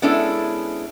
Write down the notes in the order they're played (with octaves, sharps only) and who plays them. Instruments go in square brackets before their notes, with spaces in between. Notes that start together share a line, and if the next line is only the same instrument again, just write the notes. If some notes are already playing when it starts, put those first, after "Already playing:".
[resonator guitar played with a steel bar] G#3 B3 C#4 D4 E4 A4